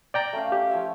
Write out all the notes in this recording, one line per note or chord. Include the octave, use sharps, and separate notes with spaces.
D5 G5 A#5
A3 C#4 F5
G4
F3 C#5 E5